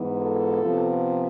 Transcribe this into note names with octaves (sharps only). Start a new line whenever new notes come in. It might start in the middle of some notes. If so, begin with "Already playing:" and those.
Already playing: G#2 E3 B3
F4 A4
C3 F3 B3